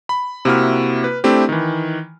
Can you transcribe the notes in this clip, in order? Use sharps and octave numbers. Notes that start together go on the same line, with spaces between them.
B5
C3 A#3 E4 F#4 B5 F6
B4
A3 C4 D4 E4 G4
D#3 E3